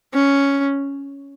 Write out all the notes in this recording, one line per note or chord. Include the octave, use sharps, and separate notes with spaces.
C#4